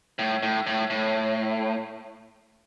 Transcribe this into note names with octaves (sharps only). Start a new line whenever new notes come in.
A2
A2
A2
A2